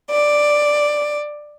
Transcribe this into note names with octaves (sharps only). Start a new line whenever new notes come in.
D5